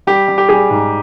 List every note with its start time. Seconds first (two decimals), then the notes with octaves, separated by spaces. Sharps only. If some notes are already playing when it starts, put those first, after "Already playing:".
0.07 G3 G4
0.28 G3
0.38 G4
0.49 G3 G#4
0.71 G#2